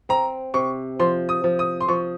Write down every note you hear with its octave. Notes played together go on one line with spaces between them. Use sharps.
C4 A#5
C3 C#6
F3 C6
D#6
F3
D#6
C6
F3 C#6